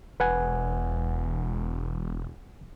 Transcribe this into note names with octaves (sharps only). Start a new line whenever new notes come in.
E1 B4 F#5 G#5